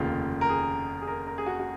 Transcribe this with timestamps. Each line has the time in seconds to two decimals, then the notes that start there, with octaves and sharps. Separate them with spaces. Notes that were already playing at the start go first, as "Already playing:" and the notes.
Already playing: F1 D#2 C#3 F4
0.41 A#4
0.49 G#4
1.02 G#4
1.08 A#4
1.27 A#4
1.38 G#4
1.46 F#4
1.60 F#4